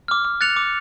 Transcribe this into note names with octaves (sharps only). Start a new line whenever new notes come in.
D6 F6
D6
F#6 A6 C#7 F7
D6